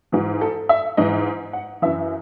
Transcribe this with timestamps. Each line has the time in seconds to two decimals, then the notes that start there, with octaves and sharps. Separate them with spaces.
0.12 G#2 E3 F#4
0.41 A4
0.69 E5
0.97 G#2 E3 D#5
1.53 F#5
1.82 F#2 E3 E5